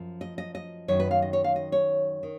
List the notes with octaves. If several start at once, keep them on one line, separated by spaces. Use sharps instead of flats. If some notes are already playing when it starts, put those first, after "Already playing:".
Already playing: F#2 F3
D#5
D#5
D#5
F#2 D#3 C#5
B4
F5
D#5
C#5
F5
D#5
C#5
D#3